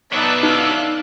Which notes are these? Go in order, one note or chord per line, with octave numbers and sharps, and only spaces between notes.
F#3 B3 D#4 A4 D5 E5 A5 F#6
D#4 F5